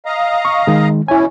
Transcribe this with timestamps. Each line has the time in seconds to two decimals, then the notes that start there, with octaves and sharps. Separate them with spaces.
0.06 D#5 F5 A#5
0.45 C#6
0.67 D#3 G#3
1.08 B2 E3 C#4 E4 G#5